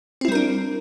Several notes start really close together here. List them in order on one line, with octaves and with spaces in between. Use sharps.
C4 E4 G3 A#4 D4